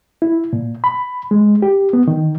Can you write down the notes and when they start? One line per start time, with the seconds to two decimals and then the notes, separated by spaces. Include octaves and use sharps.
0.22 E4
0.53 A#2
0.84 B5
1.31 G#3
1.62 G4
1.93 B3
2.08 D#3